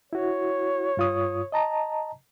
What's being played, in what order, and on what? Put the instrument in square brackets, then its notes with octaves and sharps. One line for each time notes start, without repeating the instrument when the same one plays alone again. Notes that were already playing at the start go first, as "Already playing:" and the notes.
[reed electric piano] E4 F#4 [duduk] C#5
[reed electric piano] G2 F4 D#6
D#5 A5 A#5